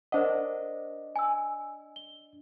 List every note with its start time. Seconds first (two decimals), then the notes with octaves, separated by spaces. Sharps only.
0.12 D4 A#4 C5 D#5 F#5
1.16 G#5 E6
1.96 G7